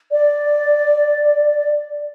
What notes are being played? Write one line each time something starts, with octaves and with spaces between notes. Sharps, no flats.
D5